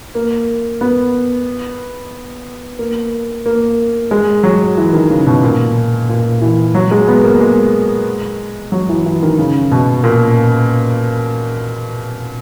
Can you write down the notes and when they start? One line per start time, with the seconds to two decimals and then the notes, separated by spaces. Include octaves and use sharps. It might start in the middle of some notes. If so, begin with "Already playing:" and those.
0.15 A#3
0.81 B3
2.79 A#3
3.46 A#3
4.11 G#3
4.43 F#3
4.77 E3
4.93 D#3
5.10 C#3
5.26 B2
5.43 A#2
6.09 A#2
6.42 E3
6.75 F#3
6.91 G#3
7.08 B3
7.24 A#3
7.40 G#3
8.72 F#3
8.89 E3
9.06 E3
9.22 D#3
9.38 C#3
9.71 B2
10.04 A#2